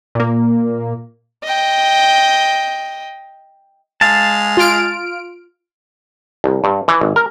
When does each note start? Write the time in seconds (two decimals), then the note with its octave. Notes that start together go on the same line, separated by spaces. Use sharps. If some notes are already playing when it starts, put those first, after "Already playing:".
0.15 A#2 A#3
1.44 D#5 G5
4.01 G#3 F5 A5
4.57 F4 F6 D7
6.44 C2
6.64 G2
6.88 E3
7.01 G#1
7.16 A#4